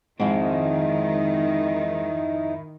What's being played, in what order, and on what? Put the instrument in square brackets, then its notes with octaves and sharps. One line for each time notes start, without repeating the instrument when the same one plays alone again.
[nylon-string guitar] F2 G#2 [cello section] D#3 [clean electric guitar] G#3 C4 [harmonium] D#4 E4